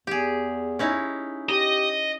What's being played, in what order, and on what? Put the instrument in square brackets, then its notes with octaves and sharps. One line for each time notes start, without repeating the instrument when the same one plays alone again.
[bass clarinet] E2 [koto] G4 G#4
[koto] C#4 D#4 E4
[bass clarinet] G4 [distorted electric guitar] D#5